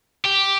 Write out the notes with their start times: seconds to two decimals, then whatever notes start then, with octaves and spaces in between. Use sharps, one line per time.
0.25 G4